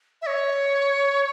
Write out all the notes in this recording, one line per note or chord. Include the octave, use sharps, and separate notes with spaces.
E5
C#5